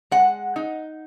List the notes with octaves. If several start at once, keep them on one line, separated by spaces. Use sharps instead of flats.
G#3 F#5
D#4